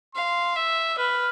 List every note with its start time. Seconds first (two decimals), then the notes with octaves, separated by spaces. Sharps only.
0.15 F5 C6
0.56 E5 E6
0.98 B4 F6